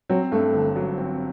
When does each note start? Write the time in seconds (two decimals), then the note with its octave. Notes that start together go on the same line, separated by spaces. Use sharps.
0.09 F#3 C4
0.32 G2 A3
0.54 G1
0.76 F#3
0.98 C4